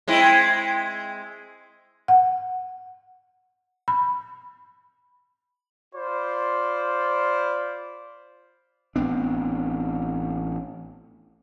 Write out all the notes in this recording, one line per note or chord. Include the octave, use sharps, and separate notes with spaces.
G#3 C4 E4
F#5
B5
F4 C5 D5 B5
A1 B3 C4 D4